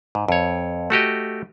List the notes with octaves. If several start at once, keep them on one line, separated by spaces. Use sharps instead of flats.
G#2
F2 C#5
A3 F#4 G4 D#5